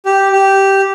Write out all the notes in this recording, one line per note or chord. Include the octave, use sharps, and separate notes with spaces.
G4
G4